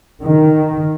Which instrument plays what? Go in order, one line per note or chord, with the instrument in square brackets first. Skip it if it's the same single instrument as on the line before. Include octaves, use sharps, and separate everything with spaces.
[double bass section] D#3